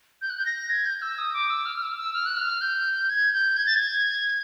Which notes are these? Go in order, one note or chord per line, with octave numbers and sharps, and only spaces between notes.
G6
F#6
G6
A#6
G#6
G6
E6
D#6
D6
E6
F6
F6
E6
E6
F6
F#6
F6
G6
G#6
G6
G#6
A6
G#6